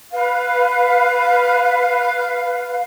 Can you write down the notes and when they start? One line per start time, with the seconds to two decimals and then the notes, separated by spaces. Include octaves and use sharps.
0.12 B4 F5